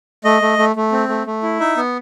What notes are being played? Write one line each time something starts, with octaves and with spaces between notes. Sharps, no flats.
A3 D#5
A3
A3
A3
C4
A3
A3
E4
D#4 E5
B3